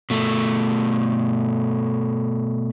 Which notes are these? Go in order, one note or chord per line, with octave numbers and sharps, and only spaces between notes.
B2 A3